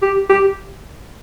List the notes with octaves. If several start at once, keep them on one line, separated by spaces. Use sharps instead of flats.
G4
G4